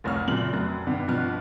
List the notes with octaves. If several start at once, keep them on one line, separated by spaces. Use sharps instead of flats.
F1 C2 C#5 F6
F#2 A#2 C#3 F#7
F1 F#2 F#6
G2 C3 D#3 B3
G2 B2 F3 F6 F#6